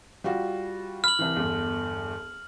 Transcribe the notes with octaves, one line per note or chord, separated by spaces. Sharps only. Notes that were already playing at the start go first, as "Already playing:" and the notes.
G3 F4 F#4
B5 F6 F#7
C2 E3
G1 E2